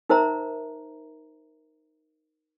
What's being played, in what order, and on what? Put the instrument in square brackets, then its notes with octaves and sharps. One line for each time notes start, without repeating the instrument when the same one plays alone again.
[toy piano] D#4 A#4 C5 E5 A#5